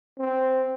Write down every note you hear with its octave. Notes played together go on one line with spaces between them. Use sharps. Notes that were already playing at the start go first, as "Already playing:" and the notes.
C4